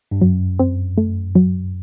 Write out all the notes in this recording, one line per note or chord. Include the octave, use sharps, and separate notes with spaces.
G2
F#2 F#3
C4
A3
F#3